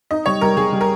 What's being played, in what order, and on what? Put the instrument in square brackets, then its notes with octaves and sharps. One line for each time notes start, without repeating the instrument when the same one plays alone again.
[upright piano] D#4 [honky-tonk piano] D#5
[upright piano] G3 [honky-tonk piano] C#5
[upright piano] G3 [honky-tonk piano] A#4
[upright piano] G3 [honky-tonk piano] G#4
[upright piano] G3
[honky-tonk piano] A#4